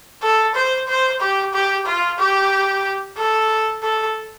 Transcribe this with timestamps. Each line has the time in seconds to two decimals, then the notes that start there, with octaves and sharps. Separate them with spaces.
0.22 A4
0.55 C5
0.88 C5
1.20 G4
1.53 G4
1.86 F4
2.19 G4
3.17 A4
3.82 A4